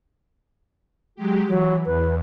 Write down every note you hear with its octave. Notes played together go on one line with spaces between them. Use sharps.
F#3 G#3 G4
E3 F#3
E2 B4